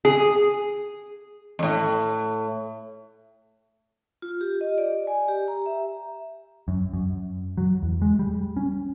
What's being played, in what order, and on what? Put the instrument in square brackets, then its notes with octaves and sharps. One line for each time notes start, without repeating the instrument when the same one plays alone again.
[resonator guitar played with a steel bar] G#4
[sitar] F2 A2
[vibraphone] F4
G4
D#5
D5
G#5
G4
A#5
E5
[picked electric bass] F#2
F#2
F#3
E2
G#3
G3
C#4